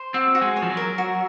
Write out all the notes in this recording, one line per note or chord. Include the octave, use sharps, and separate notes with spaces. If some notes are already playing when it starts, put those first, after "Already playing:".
Already playing: C5
C4 F#4
F#4
G#3
C#5
F3
F#3
A#4
F#4